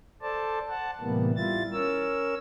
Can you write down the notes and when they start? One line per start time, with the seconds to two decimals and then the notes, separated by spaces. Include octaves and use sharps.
0.22 A4 C5 D5 A5
0.69 F#5 A5
1.01 A2 C3 E3 G3 A#3 B3
1.36 G3 E4 F4 A6
1.73 C#4 A#4 C#5 E6